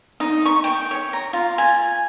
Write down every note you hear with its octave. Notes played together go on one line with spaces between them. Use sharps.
D#4
C#6
G5
C#5
A#5
F4
G#5